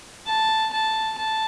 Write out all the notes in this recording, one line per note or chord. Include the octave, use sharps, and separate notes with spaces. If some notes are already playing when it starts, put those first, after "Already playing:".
A5
A5
A5